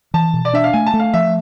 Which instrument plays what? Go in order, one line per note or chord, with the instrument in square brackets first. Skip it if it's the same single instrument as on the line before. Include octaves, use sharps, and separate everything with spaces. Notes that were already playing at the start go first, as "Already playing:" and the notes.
[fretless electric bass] E3 [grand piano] A5
[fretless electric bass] B2
[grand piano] D5
[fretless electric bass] D4 [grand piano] E5
[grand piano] F5
[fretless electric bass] A3 [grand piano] G#5
[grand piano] A5
[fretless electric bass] A3
[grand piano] F5
[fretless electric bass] F3 [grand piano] E5